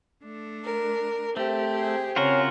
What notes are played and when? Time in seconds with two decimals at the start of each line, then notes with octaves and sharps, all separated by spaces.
0.23 A3 D4
0.64 A#4
1.37 A3 C4 G4
1.78 G#4
2.16 C#3 C4 C#4 F4 F#4 A#4